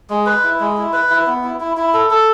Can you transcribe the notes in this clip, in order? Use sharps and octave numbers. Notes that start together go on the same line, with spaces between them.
G#3
B4
E4
G#3
E4
B4
E4
B3
E4
E4
E4
A4
A4